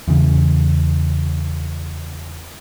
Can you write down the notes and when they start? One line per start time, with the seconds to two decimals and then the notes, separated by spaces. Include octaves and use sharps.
0.08 E2 C#3